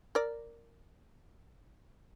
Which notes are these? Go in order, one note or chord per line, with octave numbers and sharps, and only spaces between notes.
A#4 D5